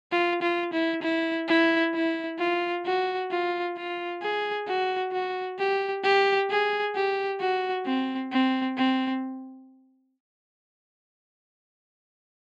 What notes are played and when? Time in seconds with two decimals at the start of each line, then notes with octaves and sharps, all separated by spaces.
0.12 F4
0.42 F4
0.73 E4
1.03 E4
1.48 E4
1.94 E4
2.39 F4
2.86 F#4
3.31 F4
3.77 F4
4.22 G#4
4.67 F#4
5.12 F#4
5.59 G4
6.04 G4
6.50 G#4
6.95 G4
7.40 F#4
7.86 C4
8.32 C4
8.77 C4